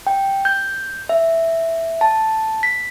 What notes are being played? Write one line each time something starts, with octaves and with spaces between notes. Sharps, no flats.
G5
G6
E5
A5
B6